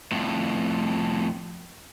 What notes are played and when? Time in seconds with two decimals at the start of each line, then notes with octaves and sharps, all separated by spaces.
0.12 F2 A2